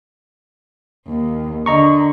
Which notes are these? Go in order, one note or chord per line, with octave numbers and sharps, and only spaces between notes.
D#2
D3 D#5 A#5 C#6